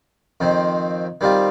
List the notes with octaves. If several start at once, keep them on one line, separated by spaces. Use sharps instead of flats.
F2 D#3 C4
D#3 G3 C4 F4